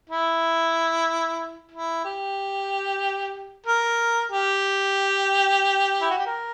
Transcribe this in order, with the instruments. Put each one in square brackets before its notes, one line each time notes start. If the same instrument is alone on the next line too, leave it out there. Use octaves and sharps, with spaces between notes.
[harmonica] E4
E4
G4
A#4
G4
E4
F#4
G4
A#4